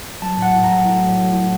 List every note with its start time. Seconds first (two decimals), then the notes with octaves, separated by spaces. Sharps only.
0.22 F#3 A5
0.38 A2 F#5
0.54 A2
0.64 F#3 A#5
0.85 A2
1.01 F#3
1.18 A2
1.32 A2